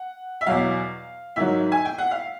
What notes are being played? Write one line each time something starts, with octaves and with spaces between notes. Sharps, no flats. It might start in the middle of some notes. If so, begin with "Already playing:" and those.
Already playing: F#5
E5
E2 B2 F#3 F5
G#2 D#3 F#3 E5
G#5
G5
F#5
F5